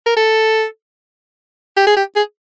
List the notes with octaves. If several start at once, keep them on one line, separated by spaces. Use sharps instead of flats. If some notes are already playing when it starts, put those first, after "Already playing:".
A#4
A4
G4
G#4
G4
G#4